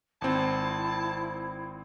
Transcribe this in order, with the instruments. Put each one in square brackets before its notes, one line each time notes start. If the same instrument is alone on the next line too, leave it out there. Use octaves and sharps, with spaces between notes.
[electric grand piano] G#1 C4 [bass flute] E4 [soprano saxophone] A5